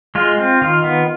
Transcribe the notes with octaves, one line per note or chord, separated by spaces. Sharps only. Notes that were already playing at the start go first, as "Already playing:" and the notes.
G#3 F4
C4
D#3 F4
B3